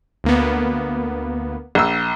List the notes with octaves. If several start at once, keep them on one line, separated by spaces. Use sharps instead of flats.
D2 A#3 B3
A#1 E6